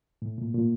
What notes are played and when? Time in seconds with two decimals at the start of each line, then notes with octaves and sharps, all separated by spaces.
0.22 A2
0.38 A#2
0.54 A#2